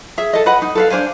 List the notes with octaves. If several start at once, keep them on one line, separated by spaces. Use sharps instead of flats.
G#4 E5
A4 D#5
B4 D#5 F#5 B5
D#4
A4 B4 F5
D4 C5 F5 G#5